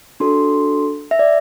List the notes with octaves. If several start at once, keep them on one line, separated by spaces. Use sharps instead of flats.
D4 F#4 A4 C6
E5
D5